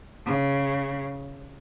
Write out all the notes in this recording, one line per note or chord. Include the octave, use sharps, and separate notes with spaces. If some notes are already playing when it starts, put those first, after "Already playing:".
C#3